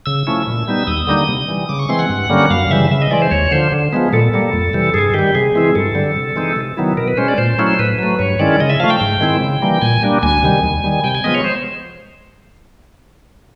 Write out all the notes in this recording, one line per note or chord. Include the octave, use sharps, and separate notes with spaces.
C#3 E6
F3 A3 C#4 E4
A#2
G3 B3 D#4
D#2 D#6
D3 G3 A#3 D#4
C3
E3 G3
C#3 D6
C#6
E3 G#3 C4 C6
F#5
G2
D3 G3 A#3 C#4
F#2 F5
C#3 E3 G3 E5
C#3 E5
D#5
E3 G#3 D5
C5
D#2 C#5
D3 F3 C5
D3
F3 G#3 B3
A#2 A4
G3 A#3
F2
C3 E3 G3
G2 G#4
D#3 G3 G4
C3 G#4
E3 G#3 C4 E4
G2 A4
D3 G3
C3
E3 G#3 C4 D#4
C3
D#3 F#3 B3 E4
B2 A#4
B4
G#3 C#4 C5
D5
A#2 C5
F#3 A3 C#4 E4
A2 B4
F#3 A3
G2 C#5
D#3 G#3 C#4 E4 D5
C#3 D#5
E5
F3 A3 F5
G5
G#2
D#3 G#3 C4 E4
C#3
E3 G3 A#3
A#2 G#5
G3 A#3 D4
D2 G#5
C3 D#3 G3
D#2
D#3 G3
C3 G5
G#5
F3 G#3 B3 D#5
C#5
C5